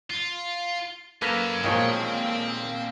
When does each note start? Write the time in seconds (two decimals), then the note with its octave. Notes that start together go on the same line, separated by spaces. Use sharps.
0.10 F4
1.22 F#3 A#3 C#4 A4 B4 A#6 B6 E7
1.64 B1 A#2 D#3 F3 G#3 C4 C#5 G5